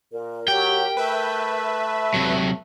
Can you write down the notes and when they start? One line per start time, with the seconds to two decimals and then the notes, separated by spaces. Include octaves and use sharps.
0.12 A#2 A#4
0.48 F#3 G4 G5
0.97 A3 B4 E5
2.14 C3 F#3